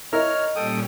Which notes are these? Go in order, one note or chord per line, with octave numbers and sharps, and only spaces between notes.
E4 A#4 C#5 D#5 F6
A#2 G3 C#4 A4 G5 D#6